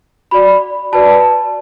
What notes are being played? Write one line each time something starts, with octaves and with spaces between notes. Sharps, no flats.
F#4 D5 B5
F#4 B4 D5 A5